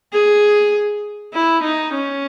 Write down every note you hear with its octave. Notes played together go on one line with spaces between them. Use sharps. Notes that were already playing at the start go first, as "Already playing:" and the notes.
G#4
E4
D#4
C#4